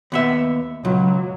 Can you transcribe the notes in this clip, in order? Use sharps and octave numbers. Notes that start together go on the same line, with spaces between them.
D#2 B3 E5
C#2 F#3